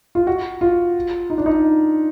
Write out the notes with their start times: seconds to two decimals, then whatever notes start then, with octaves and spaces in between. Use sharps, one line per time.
0.15 F4
0.27 F#4
0.61 F4
1.30 D#4
1.38 D4
1.46 D#4